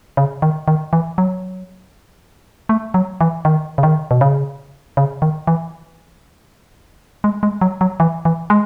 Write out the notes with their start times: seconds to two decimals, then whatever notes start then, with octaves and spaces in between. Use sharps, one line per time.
0.17 C#3
0.42 D#3
0.68 D#3
0.93 E3
1.18 F#3
2.69 A3
2.94 F#3
3.21 E3
3.45 D#3
3.78 C#3
3.83 D#3
4.11 B2
4.21 C#3
4.97 C#3
5.22 D#3
5.47 E3
7.24 G#3
7.43 G#3
7.61 F#3
7.81 F#3
8.00 E3
8.25 E3
8.50 G#3